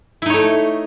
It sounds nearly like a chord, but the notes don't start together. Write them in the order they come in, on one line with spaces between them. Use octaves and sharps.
E4 D#4 C#5 A3